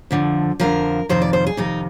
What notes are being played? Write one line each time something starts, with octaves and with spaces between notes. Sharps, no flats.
F2 D3 F3
F2 D3 F3 A#4
F2 C3 D#3 C5
D5
C5
G#4
F2 C3 D#3 D#4